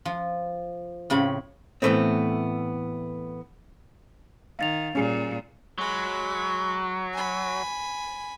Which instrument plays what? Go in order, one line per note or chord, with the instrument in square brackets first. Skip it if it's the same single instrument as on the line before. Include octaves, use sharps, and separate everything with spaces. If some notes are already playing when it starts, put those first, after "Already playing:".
[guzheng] F3
A2 C#3 C4 B5
[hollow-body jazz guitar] A2 E3 F3 A3 B3 C4
[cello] D#3 [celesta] F5 A6 F7
[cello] A#2 G3 [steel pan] C#4 G#4
[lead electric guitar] F#3 [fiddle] G#3 B5
[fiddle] G#5 B5